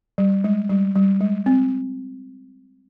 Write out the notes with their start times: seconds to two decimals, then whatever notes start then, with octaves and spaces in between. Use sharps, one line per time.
0.18 G3
0.44 G#3
0.70 G3
0.95 G3
1.20 G#3
1.46 C4